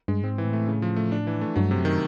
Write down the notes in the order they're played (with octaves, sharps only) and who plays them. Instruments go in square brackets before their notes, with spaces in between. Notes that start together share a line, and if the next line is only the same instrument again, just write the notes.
[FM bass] G2 [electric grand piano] G#3
[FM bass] G#2 [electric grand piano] C4
[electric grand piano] E3
[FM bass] A2
[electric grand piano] A3
C#3
F3
A3
D4
E3
A3
[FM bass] G2 [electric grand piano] F#3
[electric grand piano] C3
[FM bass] F#2
[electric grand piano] D#3